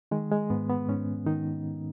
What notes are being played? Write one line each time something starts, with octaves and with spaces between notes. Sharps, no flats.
D#3 G#3
G#3
G#2 B3
B3
G#2 C#4
D#3 D#4